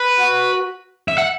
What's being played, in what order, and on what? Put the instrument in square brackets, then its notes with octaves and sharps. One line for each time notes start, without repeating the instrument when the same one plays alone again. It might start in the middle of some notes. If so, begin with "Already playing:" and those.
Already playing: [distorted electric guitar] B4
[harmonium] F#4
[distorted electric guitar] E5
F#5